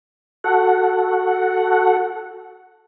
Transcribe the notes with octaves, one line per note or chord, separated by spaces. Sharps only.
F#4 A4 F#5